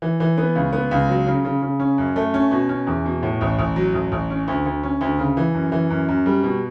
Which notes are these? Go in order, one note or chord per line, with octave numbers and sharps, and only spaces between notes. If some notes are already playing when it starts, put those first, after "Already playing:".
E3
E3
B3
C#2
B3
C#2
F#3
C#3
C#3
C#3
C#4
F#2
A3
C#4
B2
C#4
E2
B2
A2
A1
A1
F#3
A1
A1
C#4
D2
D2
C#4
D2
C#3
E3
F#2
E3
F#2
F#2
G3
B2